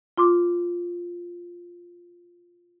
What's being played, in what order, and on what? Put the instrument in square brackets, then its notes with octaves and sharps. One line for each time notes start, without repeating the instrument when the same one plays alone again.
[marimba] F4 C6 D6